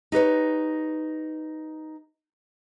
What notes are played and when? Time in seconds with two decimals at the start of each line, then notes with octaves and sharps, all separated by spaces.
0.12 D#4 G4 B4 C#5